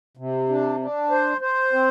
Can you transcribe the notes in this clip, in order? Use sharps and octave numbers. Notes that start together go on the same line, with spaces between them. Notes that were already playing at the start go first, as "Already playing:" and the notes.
C3
D4
D4
C5
C5
C4